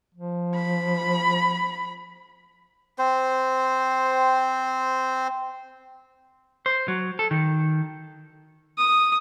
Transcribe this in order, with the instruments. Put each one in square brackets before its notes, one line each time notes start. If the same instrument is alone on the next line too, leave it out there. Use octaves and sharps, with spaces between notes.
[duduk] F3
[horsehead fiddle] B5
[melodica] C4 C5
[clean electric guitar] C5
F#3
A4
D#3
[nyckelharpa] D#6